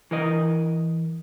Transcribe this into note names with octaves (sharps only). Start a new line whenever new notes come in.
E3 A#4 D#5